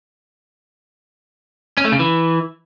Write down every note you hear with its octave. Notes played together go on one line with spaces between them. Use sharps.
C#4
A3
C#3
E3